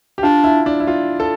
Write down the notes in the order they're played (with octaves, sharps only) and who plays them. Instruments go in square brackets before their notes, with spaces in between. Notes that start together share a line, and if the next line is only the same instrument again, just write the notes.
[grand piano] G4
[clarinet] D4 [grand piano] F4
[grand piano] E4
D4
E4
F4
A4